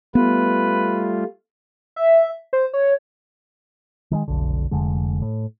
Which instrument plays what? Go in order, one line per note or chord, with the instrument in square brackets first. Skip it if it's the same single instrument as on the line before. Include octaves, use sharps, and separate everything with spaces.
[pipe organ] G3 A3 F4 [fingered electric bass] B3 [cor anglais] B4
[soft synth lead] E5
C5
C#5
[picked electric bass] D#3 F#3 G#3
F1 B1 D3
F1 D3 G#3
A2